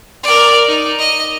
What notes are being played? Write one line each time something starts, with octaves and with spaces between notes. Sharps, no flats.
A#4 D5
D#4
D#5